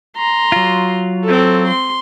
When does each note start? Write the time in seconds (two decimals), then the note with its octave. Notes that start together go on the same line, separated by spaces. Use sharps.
0.17 A#5 C6
0.52 F#3 F4
1.25 C4 A4
1.67 C6